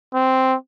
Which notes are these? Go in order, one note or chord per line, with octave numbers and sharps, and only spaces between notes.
C4